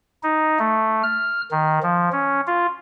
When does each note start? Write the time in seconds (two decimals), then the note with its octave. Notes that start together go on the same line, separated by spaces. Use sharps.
0.23 D#4
0.59 A3
1.03 F6
1.51 D#3
1.83 F3
2.12 C#4
2.47 F4